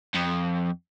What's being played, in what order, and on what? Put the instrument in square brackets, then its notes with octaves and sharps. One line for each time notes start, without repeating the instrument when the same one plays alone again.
[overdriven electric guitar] F2